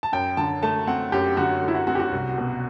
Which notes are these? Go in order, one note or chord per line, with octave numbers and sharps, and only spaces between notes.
A5
F#2 G5
D3 A5
A3 A5
C4 F#5
F#2 G4
D3 F#4
A3
E4
F#4
C4 F#4
G4
F#4
C2
B2